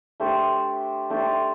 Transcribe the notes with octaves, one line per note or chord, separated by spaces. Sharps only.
A3 D4 G4 C5
A3 D4 G4 C5